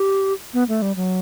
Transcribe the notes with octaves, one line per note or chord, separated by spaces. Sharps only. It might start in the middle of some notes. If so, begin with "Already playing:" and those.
Already playing: G4
B3
A3
G3
F#3